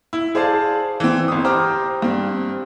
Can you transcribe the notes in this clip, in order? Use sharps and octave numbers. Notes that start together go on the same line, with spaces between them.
E4
G#4 C5 D5 F5 A5
E3 C4
G1 D#6
G4 C5 G5 A#5 D6 F6
G2 C4